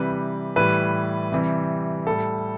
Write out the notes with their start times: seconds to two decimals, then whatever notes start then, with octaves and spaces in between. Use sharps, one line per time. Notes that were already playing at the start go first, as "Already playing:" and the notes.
Already playing: C3 E3 G3 B4
0.56 A2 E3 G3 B4
1.32 C3 E3 G3
2.07 A2 G3 A4